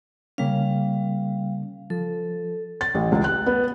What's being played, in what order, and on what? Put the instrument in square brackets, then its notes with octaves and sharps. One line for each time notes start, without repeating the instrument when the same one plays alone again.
[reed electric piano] C#3 A#3 C#4 [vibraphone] G3 F5
[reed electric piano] F3 [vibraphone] A4
[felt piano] A6
A1
C#2
F#6
B3